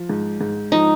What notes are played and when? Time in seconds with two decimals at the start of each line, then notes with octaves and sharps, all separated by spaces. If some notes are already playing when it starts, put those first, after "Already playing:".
Already playing: F3
0.09 G#2
0.41 G#2
0.72 F3 D#4